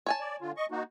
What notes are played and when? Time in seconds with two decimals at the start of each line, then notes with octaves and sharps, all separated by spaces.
0.07 C#5 G#5 A5
0.20 D5
0.41 D3 F4
0.57 D#5 C#6
0.71 A#3 D#4 F#4